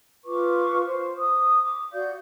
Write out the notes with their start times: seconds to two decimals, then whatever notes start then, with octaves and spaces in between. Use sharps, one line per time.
0.24 F4 B4 C#6 D6
0.85 C5
1.17 D#6
1.62 D6
1.91 F#4 D5 F5 G6